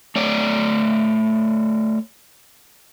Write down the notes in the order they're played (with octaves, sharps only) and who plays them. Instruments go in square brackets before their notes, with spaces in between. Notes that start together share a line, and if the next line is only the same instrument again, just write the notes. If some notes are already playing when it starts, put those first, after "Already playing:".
[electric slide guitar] A3 C#5 D5